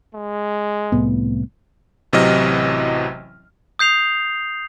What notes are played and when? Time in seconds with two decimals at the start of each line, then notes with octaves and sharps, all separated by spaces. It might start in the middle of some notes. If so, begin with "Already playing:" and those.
0.14 G#3
0.92 C2 A2 B3
2.13 A1 C3 E3 F#3 D#5 F6
3.79 D#6 G6 C7 F7